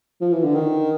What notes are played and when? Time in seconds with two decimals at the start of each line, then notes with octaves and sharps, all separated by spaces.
0.21 F3
0.33 E3
0.44 D3
0.55 D#3